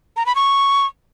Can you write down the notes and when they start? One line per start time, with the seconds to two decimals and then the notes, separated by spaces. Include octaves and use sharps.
0.17 A#5
0.26 B5
0.35 C#6